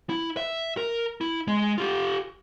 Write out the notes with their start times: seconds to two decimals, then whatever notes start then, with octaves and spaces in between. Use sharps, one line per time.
0.09 E4
0.37 E5
0.77 A#4
1.21 E4
1.48 G#3
1.78 F4 G4